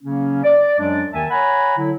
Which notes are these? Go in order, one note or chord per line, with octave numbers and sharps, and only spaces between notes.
C#3 F#3 A#3 C#4
D5
F#2 F#3 G#3 D4 D5
D#2 D#3 A#3 E5 G#5 A5
C#5 F#5 G#5 A#5 B5
D3 F#3 E4